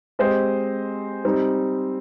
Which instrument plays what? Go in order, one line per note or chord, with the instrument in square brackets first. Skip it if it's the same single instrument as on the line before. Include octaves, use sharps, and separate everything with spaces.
[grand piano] G#3 C4 G4 C5 D#5
G3 C4 D#4